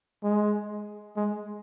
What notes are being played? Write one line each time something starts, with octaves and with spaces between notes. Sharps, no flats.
G#3
G#3